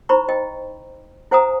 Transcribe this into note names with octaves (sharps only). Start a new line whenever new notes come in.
D#4 E4 C5 A#5 B5 C#6
D#5 G5
E4 C5 F#5 G#5 A#5 D#6